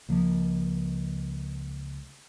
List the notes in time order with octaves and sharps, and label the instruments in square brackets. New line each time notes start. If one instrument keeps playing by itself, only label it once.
[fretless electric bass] C#2 F3 A#3